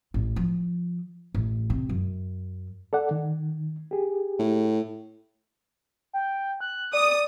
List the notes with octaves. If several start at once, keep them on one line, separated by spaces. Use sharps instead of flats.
A1
F3
A1
C3
F#2
A4 D5 F#5
D#3
G4 G#4
A2
G5
F#6
D5 D#6